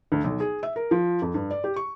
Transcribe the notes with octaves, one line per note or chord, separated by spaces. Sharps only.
D2
B1
G#4
E5
A#4
F3
F2
G2
D5
G4
C#6